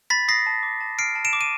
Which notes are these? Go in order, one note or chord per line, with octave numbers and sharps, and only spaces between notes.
B5 A6 B6
D#6 A#6 C7
A5
D6
A5
F6 C7 D7
A5
D7 E7
D6
D#7